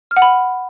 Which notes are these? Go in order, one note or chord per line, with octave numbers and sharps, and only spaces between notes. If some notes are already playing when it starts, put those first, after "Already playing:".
F6
F#5
B5